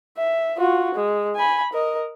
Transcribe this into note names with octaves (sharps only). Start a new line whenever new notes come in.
E5
F4 F#4
G#3
G#5 B5
A#4 D#5